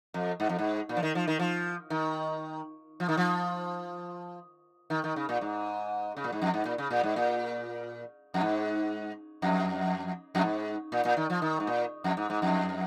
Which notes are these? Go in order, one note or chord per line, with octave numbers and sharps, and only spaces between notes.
F2
G#2
F2
G#2
A#2
F3
D#3
F3
D#3
F3
D#3
F3
D#3
F3
D#3
D#3
C#3
A#2
G#2
C#3
A#2
G#2
F2
G#2
A#2
C#3
A#2
G#2
A#2
F2
G#2
F2
F2
G#2
A#2
A#2
D#3
F3
D#3
G#2
A#2
F2
G#2
G#2
F2